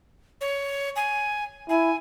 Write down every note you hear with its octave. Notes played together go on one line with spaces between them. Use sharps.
C#5
G#5
E4 G#5